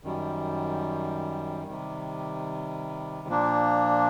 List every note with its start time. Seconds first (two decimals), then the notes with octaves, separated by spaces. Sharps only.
0.03 F#2 D#3 G3
1.65 C3 D#3 G3
3.28 A#2 F3 A#3 D4